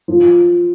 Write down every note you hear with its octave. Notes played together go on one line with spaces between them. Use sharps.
F3